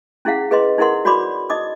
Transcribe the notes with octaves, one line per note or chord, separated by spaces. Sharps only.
C#4 E4 G#4 F5 F#5
G#4 B4 D#5 C6
D#4 E4 G#4 A#4 F#5 C6
F#4 C#5 D5 B5 C6 D6
D#4 D#5 D6 D#6